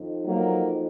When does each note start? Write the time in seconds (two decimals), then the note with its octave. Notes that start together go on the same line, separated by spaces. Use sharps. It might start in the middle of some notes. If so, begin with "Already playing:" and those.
Already playing: F2 D#3
0.24 F#3 A#3